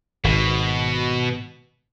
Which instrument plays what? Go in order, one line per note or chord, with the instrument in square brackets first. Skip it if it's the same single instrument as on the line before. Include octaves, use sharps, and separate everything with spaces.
[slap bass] G#1 [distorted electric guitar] B2